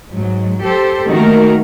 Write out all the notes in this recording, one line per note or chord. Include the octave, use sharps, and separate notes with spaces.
G#2 F#3
G4 A4 C5
D#3 A3 A#3 F#4 A#4